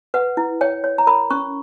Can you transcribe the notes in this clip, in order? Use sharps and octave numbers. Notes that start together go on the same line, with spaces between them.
B4 F#5
E4
C#5 G5
C#5
A#5
A#4 B5
C#4 C#6